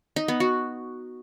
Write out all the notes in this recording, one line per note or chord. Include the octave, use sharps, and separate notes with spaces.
D#4
B3
F#4